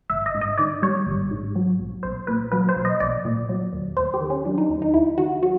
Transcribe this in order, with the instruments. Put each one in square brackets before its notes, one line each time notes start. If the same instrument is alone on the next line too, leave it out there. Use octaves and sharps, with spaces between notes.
[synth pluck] G#1 E5
D#5
G#2
D#5
D#3 D5
G3 C#5
G#1
G#2
F#3
B1
B1 C5
A#2 B4
F#3 B4
C5
B1
D#5
B1 D5
A#2
F#3
D#2
D#2 C5
G4
D#3
C#4
F#3 D4
D#4
D#2
D#4
D#2 E4
D#3 F#4
F#3 F#4